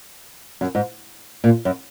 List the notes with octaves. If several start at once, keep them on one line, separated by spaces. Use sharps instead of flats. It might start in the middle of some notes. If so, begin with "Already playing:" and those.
F#2
G#2
A#2
F#2